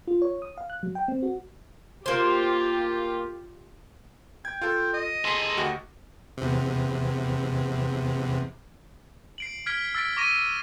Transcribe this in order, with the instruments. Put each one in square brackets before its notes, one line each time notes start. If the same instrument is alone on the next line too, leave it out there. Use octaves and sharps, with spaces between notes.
[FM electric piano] F4
C#5
D#6
F5
F#6
F#3
G5
C4
F#4
[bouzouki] A#3 C5 [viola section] F4 G4
[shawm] G5 [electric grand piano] G#6
[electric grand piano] F4 A4 [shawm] G5
[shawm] D#5
[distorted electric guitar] G#4 A4 [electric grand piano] C6 B6
[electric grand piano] D2 F#4 G4
[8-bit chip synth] E2 C3
[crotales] C7 D7 F#7
F6 G#6 B6 D7 G7
E6 A6 B6 D7
C#6 D6 A#6 D7 D#7